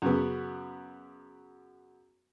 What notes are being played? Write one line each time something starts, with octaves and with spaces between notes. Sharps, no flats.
F#2 C#3 B3